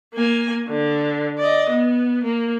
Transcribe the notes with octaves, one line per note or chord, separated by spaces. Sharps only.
A#3 G#5
D3
D5 D#5
B3
A#3